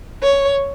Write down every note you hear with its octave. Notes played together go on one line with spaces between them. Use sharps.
C#5